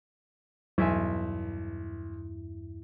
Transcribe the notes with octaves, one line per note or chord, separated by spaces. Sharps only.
B1 E2 G2 E4 E5 G#5